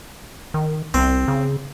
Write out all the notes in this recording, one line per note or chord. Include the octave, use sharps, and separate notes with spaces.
D#3
C2 C4
C#3